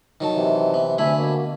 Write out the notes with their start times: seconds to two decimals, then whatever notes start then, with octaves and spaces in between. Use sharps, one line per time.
0.20 D#3 F#3 A5
0.34 C3 E3
0.74 B3
0.98 D2 A3 E5 G#5 B5
1.17 B2 A#3